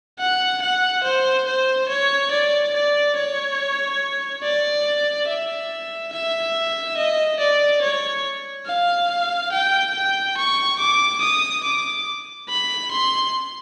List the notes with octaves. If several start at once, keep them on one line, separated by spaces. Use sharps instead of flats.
F#5
F#5
C5
C5
C#5
D5
D5
C#5
D5
E5
E5
D#5
D5
C#5
F5
G5
G5
C#6
D6
D#6
D6
B5
C6